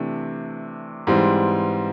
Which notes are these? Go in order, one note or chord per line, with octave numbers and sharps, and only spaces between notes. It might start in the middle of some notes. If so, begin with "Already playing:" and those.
Already playing: C3 E3 A3 D4
G#2 E3 G3 C4